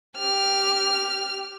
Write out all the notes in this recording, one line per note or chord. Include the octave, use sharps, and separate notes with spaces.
G4 F6